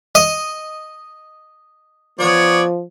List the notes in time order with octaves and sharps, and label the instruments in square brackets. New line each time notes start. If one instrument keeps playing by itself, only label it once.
[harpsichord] D#5
[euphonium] F3 [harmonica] B3 C#5 D5